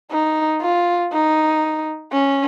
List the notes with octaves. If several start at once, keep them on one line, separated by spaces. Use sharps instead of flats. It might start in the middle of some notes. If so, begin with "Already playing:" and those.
D#4
F4
D#4
C#4